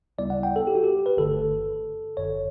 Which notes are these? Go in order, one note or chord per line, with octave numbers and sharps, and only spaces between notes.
D2 C#3 G3 B3 E4 D5
F#5
G5
A4
G4
F#4
G4
B4
G1 G2 D3 A3 A4
G1 F#2 D3 C#5